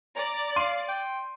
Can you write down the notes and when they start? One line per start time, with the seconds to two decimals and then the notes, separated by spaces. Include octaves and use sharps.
0.16 D5 A#5
0.56 F5 C6 D#7
0.89 G5